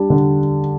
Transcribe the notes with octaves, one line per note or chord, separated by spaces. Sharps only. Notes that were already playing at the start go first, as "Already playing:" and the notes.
Already playing: G3 D4
D3